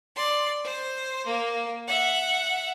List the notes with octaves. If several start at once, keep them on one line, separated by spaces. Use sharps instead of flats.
D5 C6
C5
A#3
E5 F#5